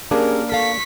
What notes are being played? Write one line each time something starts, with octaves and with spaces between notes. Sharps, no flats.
A#3 C#4 D4 G4 G#4 A#4
A4 F5 C#6 B6